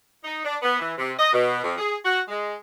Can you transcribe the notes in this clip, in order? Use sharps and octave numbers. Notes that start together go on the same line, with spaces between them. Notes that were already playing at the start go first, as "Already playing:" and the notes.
D#4
D4
B3
E3
C3
D#5
B2
F2
G#4
F#4
G#3